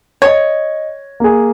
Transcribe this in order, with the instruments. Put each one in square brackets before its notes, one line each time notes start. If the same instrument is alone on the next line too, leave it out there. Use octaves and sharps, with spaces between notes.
[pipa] C#5 [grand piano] D#5 G#6
[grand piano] A#3 G#4